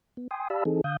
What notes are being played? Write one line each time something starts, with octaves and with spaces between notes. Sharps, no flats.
B3
G5 G#5 C6 D#6
G4 D5 F5 A5 B5 E6
E3 C4 D#4 G#4 A4
D3 F5 D#6 G6